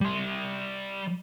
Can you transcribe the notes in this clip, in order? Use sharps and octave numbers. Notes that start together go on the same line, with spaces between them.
G3 C6